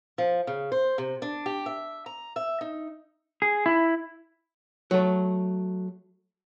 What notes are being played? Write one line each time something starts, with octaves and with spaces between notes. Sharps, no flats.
F3
C#3
C5
C3
D4
G4
E5
A#5
E5
D#4
G#4
E4
F#3 A3